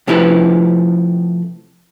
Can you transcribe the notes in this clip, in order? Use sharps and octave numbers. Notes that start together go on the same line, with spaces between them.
C3 F3 A3 E4 G4 B4